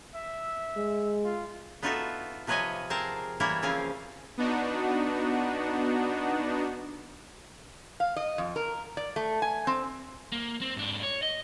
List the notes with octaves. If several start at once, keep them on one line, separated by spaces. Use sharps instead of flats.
E5
G#3
F4
B3 D#4 F4 F#4 A4 E5
C3 F3 B4 C#5 D#5 G#5
C4 G#4 A#4 A5
E3 G3 A#3 E4 A#4 C#5
C#3 F3 C4 F5 G#5
B3 D4 D#4 F#4
F5
D#5
F2
A#4
D5
A3
G#5
C4
A#3
C4
G#2 D4
C#5
D#5